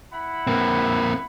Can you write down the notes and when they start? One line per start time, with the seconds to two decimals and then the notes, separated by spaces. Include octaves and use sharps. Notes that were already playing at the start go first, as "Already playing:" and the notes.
0.13 E4 F#5 B5
0.47 A#3 C4